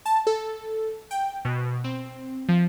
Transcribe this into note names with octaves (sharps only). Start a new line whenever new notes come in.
A5
A4
G5
B2
C4
F3